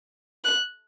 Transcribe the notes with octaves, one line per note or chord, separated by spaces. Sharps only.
F#6